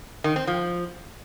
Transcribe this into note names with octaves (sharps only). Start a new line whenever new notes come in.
D#3
C4
F3